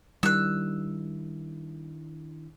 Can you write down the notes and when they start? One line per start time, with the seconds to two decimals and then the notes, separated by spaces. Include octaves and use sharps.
0.23 D#3 G3 D4 E4 E6 F#6